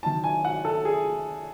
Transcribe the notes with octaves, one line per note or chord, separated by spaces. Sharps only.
D#3 F#3 C#4 A5
G#5
F#5
A4
G#4